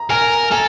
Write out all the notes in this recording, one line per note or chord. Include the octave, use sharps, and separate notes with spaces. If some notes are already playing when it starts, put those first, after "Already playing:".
Already playing: A#5
A#4 G#5
A4 G#5